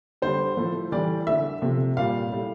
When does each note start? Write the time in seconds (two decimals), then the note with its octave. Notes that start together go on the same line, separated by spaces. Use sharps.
0.22 D3 G3 C5
0.57 A2 F3 A3
0.92 A2 E3 G3 D5
1.27 D3 A3 E5
1.62 C3 F3 A3
1.97 A#2 G3 F5
2.32 A2 G3